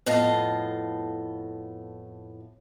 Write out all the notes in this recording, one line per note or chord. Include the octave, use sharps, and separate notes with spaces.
F2 A2 B3 D#5 F5 A5